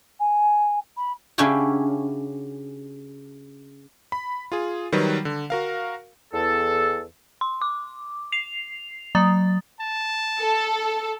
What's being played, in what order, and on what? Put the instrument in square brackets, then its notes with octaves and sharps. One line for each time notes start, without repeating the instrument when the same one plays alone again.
[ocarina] G#5
B5
[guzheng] C#3 C#4 D4 E4 F#4 G4
[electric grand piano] B5
F4 G#4
D#3 F#3 G3 B4
D3
F#4 A#4 F5
[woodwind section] E2 A4
[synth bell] C6
D6
C7 F7
F#3 A#5 D#6 A6
[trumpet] A5
[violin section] A4